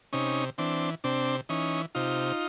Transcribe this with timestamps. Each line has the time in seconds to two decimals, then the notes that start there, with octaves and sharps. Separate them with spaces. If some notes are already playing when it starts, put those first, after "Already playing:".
0.13 C3 C#4 D#4
0.58 E3 C4 D4
1.04 C3 C4 D4
1.49 E3 C#4 D#4
1.95 C3 D#4 F4